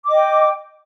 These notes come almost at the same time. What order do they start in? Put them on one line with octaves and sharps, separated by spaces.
D6 D#5 G5